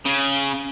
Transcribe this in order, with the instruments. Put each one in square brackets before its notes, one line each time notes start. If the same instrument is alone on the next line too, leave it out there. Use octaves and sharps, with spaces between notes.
[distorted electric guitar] C#3